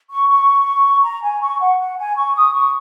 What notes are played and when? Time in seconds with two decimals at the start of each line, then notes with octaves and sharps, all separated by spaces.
0.10 C#6
0.29 C#6
1.04 A#5
1.23 G#5
1.41 C#6
1.59 F#5
1.79 F#5
1.98 G#5
2.16 C#6
2.35 D#6
2.54 C#6